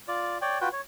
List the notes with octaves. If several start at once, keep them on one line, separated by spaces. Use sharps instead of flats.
F4 D5
C#5 D5 G5
F4 F#4 B4 G5
C#5